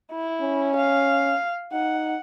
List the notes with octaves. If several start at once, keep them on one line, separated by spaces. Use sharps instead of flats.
E4
C#4
F5
D#4 F#5